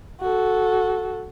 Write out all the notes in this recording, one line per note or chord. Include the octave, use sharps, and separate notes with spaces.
F#4 A4